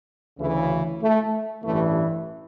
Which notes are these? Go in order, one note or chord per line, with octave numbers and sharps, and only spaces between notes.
D2 C#3 E3
A3
A1 G2 E3 A3